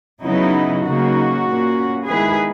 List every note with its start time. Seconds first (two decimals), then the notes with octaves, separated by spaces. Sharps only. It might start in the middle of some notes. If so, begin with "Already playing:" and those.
0.24 C#3 F#3 B3 D#4 E4
0.84 C#3 F#3 A#3 D#4 F#4
1.45 A#2 A#3 C#4
2.06 D#3 G#3 B3 E4 G#4 B4